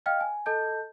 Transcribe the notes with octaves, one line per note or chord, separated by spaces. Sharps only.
D#5 F5 G5 F6
G#5
A4 D#5 A5 G6